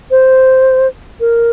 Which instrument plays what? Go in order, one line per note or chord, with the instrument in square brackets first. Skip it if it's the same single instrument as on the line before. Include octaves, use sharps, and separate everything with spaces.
[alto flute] C5
A#4